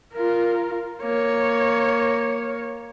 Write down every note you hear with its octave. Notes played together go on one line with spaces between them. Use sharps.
F4 A#4
A#3 C#5